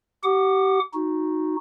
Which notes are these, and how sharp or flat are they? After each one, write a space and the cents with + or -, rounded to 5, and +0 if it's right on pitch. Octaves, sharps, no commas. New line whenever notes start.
G4 -30 F#5 +5 D6 +45
D#4 +0 F#4 -15